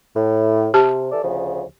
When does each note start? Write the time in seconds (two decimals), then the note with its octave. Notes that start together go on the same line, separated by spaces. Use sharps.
0.15 A2
0.74 C3 G4 A5
1.12 E3 A4 D5
1.23 D2 C#3 F3